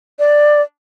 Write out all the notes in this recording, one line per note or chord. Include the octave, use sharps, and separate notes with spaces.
D5